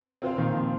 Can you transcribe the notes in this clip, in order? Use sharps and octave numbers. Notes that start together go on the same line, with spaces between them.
C3 C4 F4 C5 F5
A#2 D#3
C3 F3